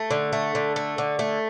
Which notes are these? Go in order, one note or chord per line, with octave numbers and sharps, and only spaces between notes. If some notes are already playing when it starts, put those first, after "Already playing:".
Already playing: A3
D3
A3
D3
A3
D3
A3